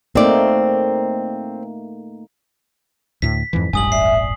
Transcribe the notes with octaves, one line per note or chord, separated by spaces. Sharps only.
A3 A#3 C4 D#4 D5
D2 A2 B6
F2 G#2 E3
E1 A1 G2 G#5 D#6 F#7
D5 E5 C7
G#5